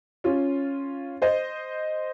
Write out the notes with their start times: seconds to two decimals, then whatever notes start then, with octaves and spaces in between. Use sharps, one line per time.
0.24 C#4 F4
1.22 C5 D#5